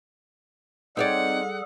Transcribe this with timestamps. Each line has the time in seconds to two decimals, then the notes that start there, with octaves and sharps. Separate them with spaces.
0.97 G3 C4 D#4 G#4 A4 C#5 D5 F#5